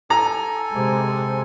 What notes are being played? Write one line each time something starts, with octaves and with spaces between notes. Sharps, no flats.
A4 G#5 A#5
C3 G#3